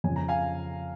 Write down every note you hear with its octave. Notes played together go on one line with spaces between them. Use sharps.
F2 C#3 G#5
A#5
F5 G#5